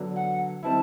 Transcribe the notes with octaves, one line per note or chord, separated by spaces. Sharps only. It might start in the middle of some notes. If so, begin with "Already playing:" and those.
Already playing: D3 F#3 B3 D4
F#5
D#3 G3 C4 E4 A5